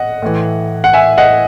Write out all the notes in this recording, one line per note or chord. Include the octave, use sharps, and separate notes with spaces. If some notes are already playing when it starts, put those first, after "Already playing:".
Already playing: D#5 F#5
A2 E3
F#5
E5 G#5
D#5 F#5